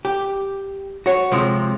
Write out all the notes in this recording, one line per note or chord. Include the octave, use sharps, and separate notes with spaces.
G4
F#4 C#5
C3 F3 G#3